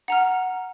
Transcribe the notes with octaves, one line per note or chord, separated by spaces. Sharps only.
F#5 A#5 F6